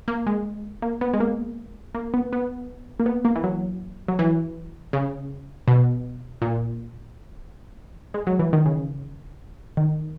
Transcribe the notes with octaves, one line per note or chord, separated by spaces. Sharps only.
A#3
G#3
A#3
B3
G#3
A#3
A#3
B3
B3
A#3
B3
A#3
E3
F#3
F#3
E3
C#3
B2
A#2
G#3
F#3
E3
D#3
C#3
D#3